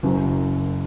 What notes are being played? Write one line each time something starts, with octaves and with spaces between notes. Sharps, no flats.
F#1 F#2 F#3